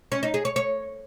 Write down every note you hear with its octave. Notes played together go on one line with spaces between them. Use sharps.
C#4
D#4
G#4
C#5
C#5